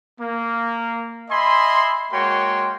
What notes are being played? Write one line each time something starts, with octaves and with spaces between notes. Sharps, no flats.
A#3
D#5 E5 G#5 B5 C6
G#3 A#3 F#4 C#5 G5 C6